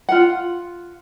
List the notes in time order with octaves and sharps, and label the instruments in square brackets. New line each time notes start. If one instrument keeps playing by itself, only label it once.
[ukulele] F4 F#5